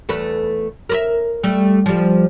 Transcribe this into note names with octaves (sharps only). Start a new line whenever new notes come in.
E2 A3 B4
A#4 B4 E5
G3 A3
F3 G3